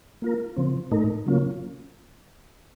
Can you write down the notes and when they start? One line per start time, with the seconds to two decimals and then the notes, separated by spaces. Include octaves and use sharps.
0.22 A#3 F4 A#4
0.56 C#3 F3 C4
0.91 A2 A3 D#4 A#4
1.26 C#3 F#3 A#3 C#4 F4